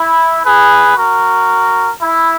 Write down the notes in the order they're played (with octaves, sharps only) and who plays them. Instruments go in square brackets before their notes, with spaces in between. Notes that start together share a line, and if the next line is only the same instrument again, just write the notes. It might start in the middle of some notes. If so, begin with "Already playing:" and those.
Already playing: [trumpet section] E4
G#4 B4
F#4 A#4
E4